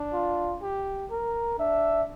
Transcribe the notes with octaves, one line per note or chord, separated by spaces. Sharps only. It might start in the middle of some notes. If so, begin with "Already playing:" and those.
Already playing: D4
F4
G4
A#4
D4 E5